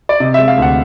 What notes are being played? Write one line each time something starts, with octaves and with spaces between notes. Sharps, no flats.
D5
C3 D#5
E5
G#3
F5
D2 F#5